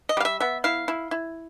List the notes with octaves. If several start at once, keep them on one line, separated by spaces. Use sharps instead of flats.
D#5
G3 F5
E5
B3 E5
E4 F5
E4
E4